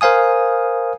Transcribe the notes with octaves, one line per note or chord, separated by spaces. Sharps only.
A#4 C5 F5 G#5 D#6